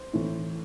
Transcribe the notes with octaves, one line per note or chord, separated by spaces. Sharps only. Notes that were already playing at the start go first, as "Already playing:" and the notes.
Already playing: C5
A2 E3